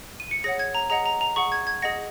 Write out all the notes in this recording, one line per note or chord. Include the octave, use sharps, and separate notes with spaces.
D#7
C#7
G#4 C#5 F#5 A#6
G#6
A#5
G#4 D#5 F#5 A#5
A#5
A#5
G#4 F#5 C#6
G#6
G#6
G#4 D#5 F#5 A#6